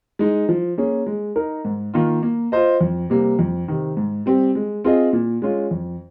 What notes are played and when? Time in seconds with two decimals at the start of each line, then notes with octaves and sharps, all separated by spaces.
0.19 G#3 D#4
0.49 F3
0.78 A#3 C#4 G#4
1.07 G#3
1.36 D#4 A#4
1.65 G#2
1.94 D#3 A#3 F4
2.23 A#3
2.52 F4 C5 D#5
2.81 F2
3.10 C3 G3 A#3
3.39 F2
3.68 C3 D#3
3.97 G#2
4.26 G3 C4 G4
4.55 G#3
4.84 C4 F4 G#4 D#5
5.13 A#2
5.42 G#3 C#4 F4
5.71 F2